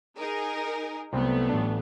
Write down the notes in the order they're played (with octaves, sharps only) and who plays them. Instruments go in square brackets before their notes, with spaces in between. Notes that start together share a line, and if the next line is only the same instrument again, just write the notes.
[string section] D#4 G#4 A#4
[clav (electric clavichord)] C2 C4 [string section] F#3 A3 B3
[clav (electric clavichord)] A1 D4